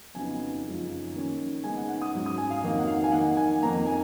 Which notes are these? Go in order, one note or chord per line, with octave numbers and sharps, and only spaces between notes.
F2 C#3 F#3 B3 D#4 G#5
F#2 C#3 F3 G#3 D#4
D#3 A#3 C#4
C#3 G#3 B3 D#4 G#5
F#5
F#5
D#6
G#2 F#3 C#4
D#6
G#5
F5
F2 D#3 F#3 A#3 D#4
F#5
F5
G#5
D#3 A#3 D#4 F#5
G#5
F2 D#3 A#3 D#4 A#5
G#5